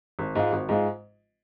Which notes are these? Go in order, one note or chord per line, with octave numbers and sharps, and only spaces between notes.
G#1
G#2 G#3 F4
G#1
G#2 G#3 F4